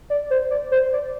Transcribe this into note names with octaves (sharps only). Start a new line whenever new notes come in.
D5
C5
D5
C5
D5